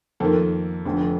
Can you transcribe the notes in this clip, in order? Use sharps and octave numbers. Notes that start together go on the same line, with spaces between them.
F2 D#3 A#3 A4
F1 F2 D3